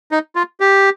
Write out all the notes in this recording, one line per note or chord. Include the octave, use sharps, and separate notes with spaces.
D#4
F4
G4